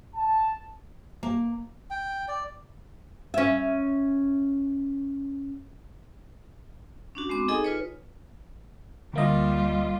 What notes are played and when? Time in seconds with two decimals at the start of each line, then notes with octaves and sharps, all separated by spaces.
0.15 A5
1.23 A#3
1.90 G5
2.28 D5
3.34 C#4 E5
7.15 C#4 D4 F#4
7.29 G#3 B3 C4 D6
7.48 D#4 G#4 A4 D#5 G#5 D#6
7.64 F4 B4 C#5
9.13 D2 G3 A#3 F4 D#5